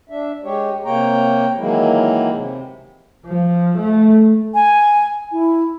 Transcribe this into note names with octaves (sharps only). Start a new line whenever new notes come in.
D4 E5
G#3 G4 C#5
C3 A#3 C#5 G5 A#5
D#3 E3 F#3 G#3 A#3 E4
C3
F3
A3
G#5
E4